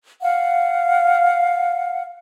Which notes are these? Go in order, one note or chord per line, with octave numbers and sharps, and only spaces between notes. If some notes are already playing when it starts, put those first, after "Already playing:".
F5 F#5